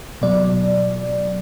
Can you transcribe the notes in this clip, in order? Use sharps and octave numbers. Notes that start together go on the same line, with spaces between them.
B2 F#3 D5